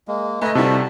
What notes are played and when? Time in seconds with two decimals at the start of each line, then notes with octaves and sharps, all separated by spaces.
0.08 G#3 A#3
0.42 A3 B4 D#5 G#5 A#5
0.55 C3 G3 E4 F#4 A4 A5